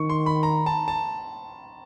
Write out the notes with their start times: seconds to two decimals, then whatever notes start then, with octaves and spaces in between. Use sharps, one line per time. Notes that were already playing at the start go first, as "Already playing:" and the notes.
Already playing: D#3 C#6
0.10 C6
0.26 B5
0.43 A#5
0.66 A5
0.88 A5